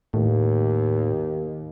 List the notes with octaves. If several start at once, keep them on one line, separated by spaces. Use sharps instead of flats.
D#2 A2